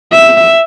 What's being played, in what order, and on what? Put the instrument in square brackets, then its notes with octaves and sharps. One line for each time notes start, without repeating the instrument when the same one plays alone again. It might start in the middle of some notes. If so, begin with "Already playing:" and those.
[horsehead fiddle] E5